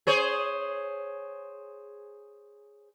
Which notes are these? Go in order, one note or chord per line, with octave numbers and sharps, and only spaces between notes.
G#4 C5 C#5